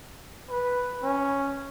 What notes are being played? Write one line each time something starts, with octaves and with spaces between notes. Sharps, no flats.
B4
C#4